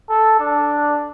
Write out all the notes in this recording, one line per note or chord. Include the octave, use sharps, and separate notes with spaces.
A4
D4